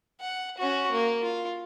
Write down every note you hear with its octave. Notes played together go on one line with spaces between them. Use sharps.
F#5
C#4 F#4
A#3
F4